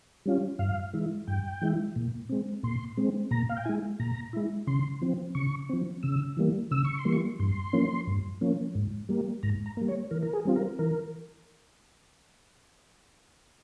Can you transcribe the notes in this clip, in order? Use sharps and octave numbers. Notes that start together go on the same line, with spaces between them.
G3 C#4 F4
G2 F5
E3 G#3 E4
G2 G5
E3 G#3 E4
A#2
G#3 C4
A#2 C6
G#3 C4
A#2 A#5
F5
G5
G#3 E4 G#5
A#2 A#5
G#3 E4
C#3 C6
F3 C4
C#3 C#6
F3 C4
C#3 E6
E3 G3 A#3
C#3 E6
C#6
C6
E3 G3 A#3
C#6
G2 C6
F3 A#3 C#4
G2
F3 A#3 C#4
G#2
G3 A#3
G#2 A#5
A#5
G3 A#3
C#5
E3 A#4
A#4
G#4
G3 C4 F4
A#4
E3 A#4